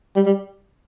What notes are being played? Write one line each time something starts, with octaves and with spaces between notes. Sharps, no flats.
G3
G3